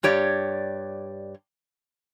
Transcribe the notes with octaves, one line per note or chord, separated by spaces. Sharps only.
G2 G4 C#5 D5